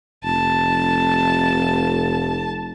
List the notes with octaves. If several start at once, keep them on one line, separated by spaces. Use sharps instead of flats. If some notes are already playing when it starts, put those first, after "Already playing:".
F1 A5